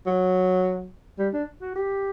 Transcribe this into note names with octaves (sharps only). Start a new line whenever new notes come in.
F#3
G3
D4
F#4
G4